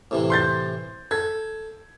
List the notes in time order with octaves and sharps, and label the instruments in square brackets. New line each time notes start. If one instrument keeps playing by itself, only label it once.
[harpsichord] A2 C3 E3
[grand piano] C6 G6 A6
[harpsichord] A4 [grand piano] G#6